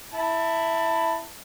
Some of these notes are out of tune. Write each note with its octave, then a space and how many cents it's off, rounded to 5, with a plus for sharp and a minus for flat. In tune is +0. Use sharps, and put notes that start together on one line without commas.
E4 +0 A5 +20